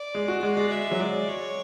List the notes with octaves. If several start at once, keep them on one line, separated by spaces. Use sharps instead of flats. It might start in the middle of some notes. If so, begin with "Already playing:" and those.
Already playing: D5
G#3
F#4
G#3 D5
G#3
E5
F#3
G#3 D5
C#5